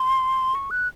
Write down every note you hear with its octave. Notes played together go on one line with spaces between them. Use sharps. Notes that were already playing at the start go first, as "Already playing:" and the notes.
Already playing: C6
C#6
F#6